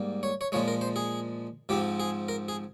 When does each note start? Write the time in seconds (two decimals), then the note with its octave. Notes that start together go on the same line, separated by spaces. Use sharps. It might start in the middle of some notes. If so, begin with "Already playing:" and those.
Already playing: G#2 G3 A#3
0.23 C#5
0.41 C#5
0.52 A#2 F3 G#3 C#5
0.68 A#4
0.81 C5
0.96 G#4
1.69 G#2 F3 C4 G4
2.00 G#4
2.28 A#4
2.48 G#4